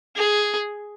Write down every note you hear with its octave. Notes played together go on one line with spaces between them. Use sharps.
G#4